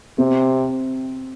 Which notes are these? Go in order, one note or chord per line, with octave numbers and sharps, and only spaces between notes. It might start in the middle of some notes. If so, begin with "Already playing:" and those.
C3 C4